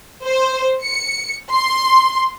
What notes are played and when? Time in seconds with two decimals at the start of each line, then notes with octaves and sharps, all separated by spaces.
0.25 C5
0.83 C#7
1.53 C6